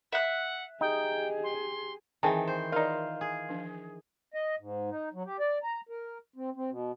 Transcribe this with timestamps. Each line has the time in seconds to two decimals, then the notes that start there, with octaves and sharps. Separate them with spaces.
0.12 E5 F#5 F#6
0.81 D#4 G4 G#4 G5
1.43 C6
2.23 D#3 E3 C4 G#4 G#5 A5
2.47 C5
2.72 D#4 F4 A#4 D5
3.21 G#4
3.49 F3 D4
4.34 D#5
4.60 G#2
4.90 D#4
5.14 F#3
5.25 G4
5.40 D5
5.63 A#5
5.89 A#4
6.36 C4
6.56 C4
6.70 B2